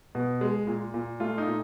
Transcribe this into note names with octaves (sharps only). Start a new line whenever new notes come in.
B2
G#3
A#2
A#2
A3 F4
D#4
A#2